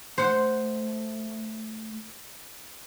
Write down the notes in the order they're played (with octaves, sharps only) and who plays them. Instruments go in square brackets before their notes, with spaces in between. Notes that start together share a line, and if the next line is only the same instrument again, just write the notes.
[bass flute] A3 [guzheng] C5 F#5